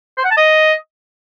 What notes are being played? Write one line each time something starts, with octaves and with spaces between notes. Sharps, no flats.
C5
F#5
A5
D#5